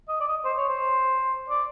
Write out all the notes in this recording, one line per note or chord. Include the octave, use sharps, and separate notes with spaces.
D#5
D5
D#5
C5
C#5
C5
D5